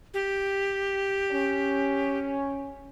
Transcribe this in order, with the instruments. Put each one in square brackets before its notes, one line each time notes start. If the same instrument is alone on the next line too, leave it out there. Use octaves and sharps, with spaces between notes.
[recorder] G4
[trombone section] C#4